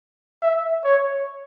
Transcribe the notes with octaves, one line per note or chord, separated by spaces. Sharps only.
E5
C#5